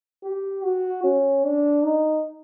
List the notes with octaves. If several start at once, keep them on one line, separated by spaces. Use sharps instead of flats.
G4
F#4
C#4
D4
D#4